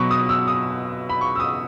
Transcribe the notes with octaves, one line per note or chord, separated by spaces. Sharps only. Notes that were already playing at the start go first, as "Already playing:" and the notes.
Already playing: B2 F#3 B5 C#6
D#6
E6
D#6
B5
C#6
E6
D#6